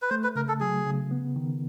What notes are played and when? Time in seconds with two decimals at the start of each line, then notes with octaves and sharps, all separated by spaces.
0.02 B4
0.10 A3 C5
0.23 B4
0.35 C#3 A#4
0.48 A4
0.60 F#3 G#4
0.86 C#3
1.11 B3
1.36 D#3